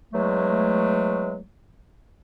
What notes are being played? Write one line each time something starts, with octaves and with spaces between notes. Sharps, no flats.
E2 F#3 G#3 A3